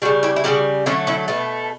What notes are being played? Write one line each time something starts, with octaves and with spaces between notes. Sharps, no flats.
C#3 G3 D4 F#4
E4 G4
E4
C#3 E3 G3 D4 F#4
D3 F#3 A3 C#4 E4
C#4 E4
B2 A3 B3